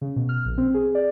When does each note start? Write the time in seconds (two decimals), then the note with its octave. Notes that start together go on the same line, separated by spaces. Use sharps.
0.01 C#3
0.16 B2
0.29 F6
0.45 A#1
0.58 C4
0.74 G#4
0.95 D5